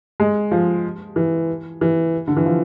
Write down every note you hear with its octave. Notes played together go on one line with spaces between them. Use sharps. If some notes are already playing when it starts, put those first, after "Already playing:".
G#3
F3
E3
E3
D3
E3
F3